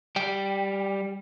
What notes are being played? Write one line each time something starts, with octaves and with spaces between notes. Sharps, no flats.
G3 G5